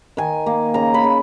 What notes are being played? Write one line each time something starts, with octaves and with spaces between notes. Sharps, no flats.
D#3 G#5
A#3
C#3 A#5
B5
C#3